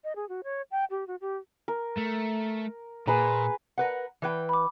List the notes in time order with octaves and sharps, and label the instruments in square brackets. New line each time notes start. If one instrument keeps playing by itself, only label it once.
[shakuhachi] D#5
G#4
F#4
C#5
G5
G4
F#4
G4
[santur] A#4
[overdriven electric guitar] A3
[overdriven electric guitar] A#2 [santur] G#4 B4 A#5
[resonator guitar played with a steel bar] A#4 B4 F#5
E3 B4 G5
[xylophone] B5 D6